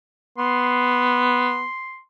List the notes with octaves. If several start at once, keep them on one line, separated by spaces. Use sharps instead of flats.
B3 C6